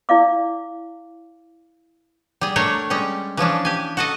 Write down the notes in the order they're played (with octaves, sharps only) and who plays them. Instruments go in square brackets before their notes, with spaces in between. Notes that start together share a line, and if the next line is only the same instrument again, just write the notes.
[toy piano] E4 D5 F5 D6
[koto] G3 G#4
A3 D4 A#4 C#5 G5
G3 G#3 C#4
E3 F3 C#4 D4
G4 G#5
F#4 A4 D#5